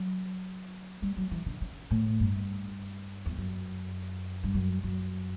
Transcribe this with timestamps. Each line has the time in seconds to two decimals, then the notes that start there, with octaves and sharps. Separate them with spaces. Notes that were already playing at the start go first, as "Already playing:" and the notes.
Already playing: F#3
1.02 G3
1.17 F#3
1.31 E3
1.46 D3
1.61 C#3
1.91 A2
2.20 G2
3.26 E2
3.37 F#2
4.44 G2
4.54 F#2
4.83 F#2